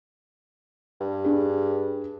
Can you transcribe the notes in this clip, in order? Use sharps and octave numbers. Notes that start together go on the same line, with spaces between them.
G2
D4 G#4